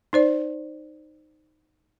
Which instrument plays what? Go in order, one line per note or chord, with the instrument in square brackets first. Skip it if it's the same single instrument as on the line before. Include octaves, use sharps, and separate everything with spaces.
[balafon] D#4 C5 D5